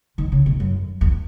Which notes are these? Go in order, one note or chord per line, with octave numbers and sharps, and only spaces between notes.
D#3
C#3
B2
F#2
E2